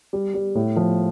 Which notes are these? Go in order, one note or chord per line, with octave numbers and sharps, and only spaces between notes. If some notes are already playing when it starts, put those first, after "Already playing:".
G3
G3
A2
F3